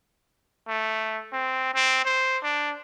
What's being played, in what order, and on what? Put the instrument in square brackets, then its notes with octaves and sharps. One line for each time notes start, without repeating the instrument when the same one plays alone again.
[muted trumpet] A3
C4
C4
C5
D4